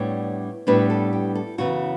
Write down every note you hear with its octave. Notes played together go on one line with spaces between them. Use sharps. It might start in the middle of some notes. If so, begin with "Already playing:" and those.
Already playing: A2 G3 B3 D4 C#5
A2 G3 B3 D4 B4
A4
G4
A4
F#2 C#3 E3 B3 F#4